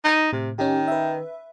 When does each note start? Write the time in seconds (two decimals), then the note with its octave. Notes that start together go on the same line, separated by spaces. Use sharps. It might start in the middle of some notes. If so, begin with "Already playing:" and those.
0.04 D#4
0.33 A2 C3
0.59 D#3 C#4 D#4 G4
0.88 B4 E5